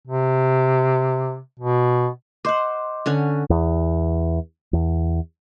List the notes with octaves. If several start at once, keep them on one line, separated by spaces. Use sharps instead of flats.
C3
B2
C5 D#5 F#5 C6 D6
D3 C#4 F#5
E2
E2